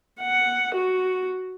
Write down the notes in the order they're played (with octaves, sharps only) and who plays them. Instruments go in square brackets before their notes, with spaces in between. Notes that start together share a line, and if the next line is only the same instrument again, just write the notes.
[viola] F#5
F#4